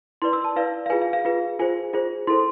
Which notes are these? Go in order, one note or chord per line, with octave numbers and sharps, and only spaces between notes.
E4 B4 D5 C6
E6
A5
E4 B4 D5 F5
F5
F4 G#4 B4 G#5
F5
F5
F4 G#4 B4
F4 G#4 C5 G#5
F4 G#4 C5
E4 A4 C5 C6